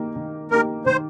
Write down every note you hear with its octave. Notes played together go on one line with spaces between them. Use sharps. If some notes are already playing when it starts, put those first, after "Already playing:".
Already playing: D#3 A#3 D#4 G4
D#3
A#3 D#4 G4 A#4
D#3 C5